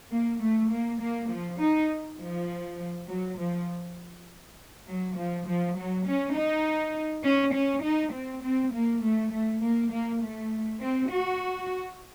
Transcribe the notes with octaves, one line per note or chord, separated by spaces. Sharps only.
A#3
A3
A#3
A#3
F3
D#4
F3
F#3
F3
F#3
F3
F3
F#3
C#4
D#4
C#4
C#4
D#4
C4
C4
A#3
A3
A3
A#3
A#3
A3
C4
F#4